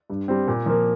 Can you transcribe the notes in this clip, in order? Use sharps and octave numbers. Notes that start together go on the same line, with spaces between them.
G2
G3 C4
A#2
F3 A#3